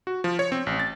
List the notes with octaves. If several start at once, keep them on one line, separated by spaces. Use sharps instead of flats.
F#4
F3
C#5
C4
A1
A6